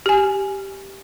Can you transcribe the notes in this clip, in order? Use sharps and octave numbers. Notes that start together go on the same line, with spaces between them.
G4 G#5